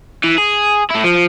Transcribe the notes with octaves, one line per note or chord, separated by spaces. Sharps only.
E3
G#4
A3 E4
F3